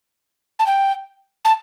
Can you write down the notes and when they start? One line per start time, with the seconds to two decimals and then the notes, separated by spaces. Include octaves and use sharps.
0.59 A5
0.66 G5
1.45 A5